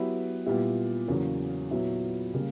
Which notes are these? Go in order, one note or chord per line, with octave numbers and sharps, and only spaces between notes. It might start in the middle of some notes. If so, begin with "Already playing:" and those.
Already playing: F#3 B3 E4 G4 B4
A#2 G3 B3 E4 G4
E2 C#3 F#3 A#3 C#4
A#2 F#3 B3 E4
C#3 G3 A#3